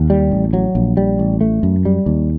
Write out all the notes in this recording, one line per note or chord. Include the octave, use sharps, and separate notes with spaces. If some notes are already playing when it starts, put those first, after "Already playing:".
Already playing: D#2
G3
A1
F#3
A#1
G3
A1
A3
F#2
G3
D#2